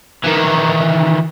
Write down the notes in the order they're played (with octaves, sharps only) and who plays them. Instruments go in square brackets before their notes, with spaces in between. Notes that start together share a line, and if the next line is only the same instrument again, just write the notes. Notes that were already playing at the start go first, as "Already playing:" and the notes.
[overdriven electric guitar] D#3 E3